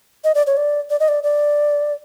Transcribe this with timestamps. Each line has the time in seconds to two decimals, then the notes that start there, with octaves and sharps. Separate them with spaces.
0.24 D#5
0.35 D5
0.47 C#5
0.57 D5
0.90 D5
1.00 D#5
1.08 D5
1.23 D5